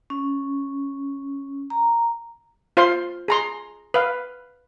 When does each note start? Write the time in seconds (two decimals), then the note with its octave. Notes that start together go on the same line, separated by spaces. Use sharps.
0.10 C#4
1.70 A#5
2.77 F4 C5 F5 C6
3.28 G#4 A#5 C6
3.94 B4 F5